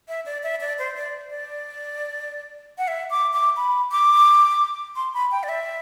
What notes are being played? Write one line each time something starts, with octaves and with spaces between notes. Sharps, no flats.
E5
D5
E5
D5
C5
D5
D5
F#5
E5
D6
D6
B5
D6
C6
B5
G5
D5
E5